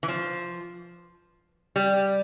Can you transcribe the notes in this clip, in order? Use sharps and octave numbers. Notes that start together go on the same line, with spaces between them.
E3
F3
G3